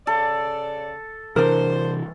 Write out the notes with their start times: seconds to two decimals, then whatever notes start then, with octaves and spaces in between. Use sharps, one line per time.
0.07 C#3 A4 D5
1.36 C3 E3 D4 A#4 C5